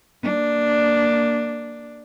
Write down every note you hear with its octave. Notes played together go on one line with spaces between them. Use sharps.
A#3 D4